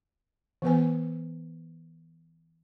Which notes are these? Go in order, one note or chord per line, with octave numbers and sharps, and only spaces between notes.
E3 B3 B4 G#5